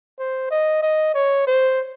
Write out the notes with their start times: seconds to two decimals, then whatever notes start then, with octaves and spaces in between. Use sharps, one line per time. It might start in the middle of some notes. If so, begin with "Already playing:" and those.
0.19 C5
0.51 D#5
0.83 D#5
1.14 C#5
1.47 C5